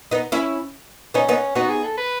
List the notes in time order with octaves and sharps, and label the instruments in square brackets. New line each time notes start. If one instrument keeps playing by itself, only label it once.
[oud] B3 D#4
C#4 E4
[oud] B3 D#4 [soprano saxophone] C#4
[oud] B3 D#4
[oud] B3 D#4 [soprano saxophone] F#4
[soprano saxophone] G#4
A4
B4